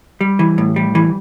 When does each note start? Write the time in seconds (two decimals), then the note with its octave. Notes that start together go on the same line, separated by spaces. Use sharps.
0.21 G3
0.39 E3
0.58 A2
0.76 G3
0.95 E3